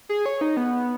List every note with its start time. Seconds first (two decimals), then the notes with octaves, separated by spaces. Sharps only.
0.09 G#4
0.26 C#5
0.41 D#4
0.57 B3